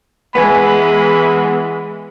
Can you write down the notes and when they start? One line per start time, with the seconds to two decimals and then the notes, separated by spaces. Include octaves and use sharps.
0.35 E3 G#3 B3 B4 G#5 B5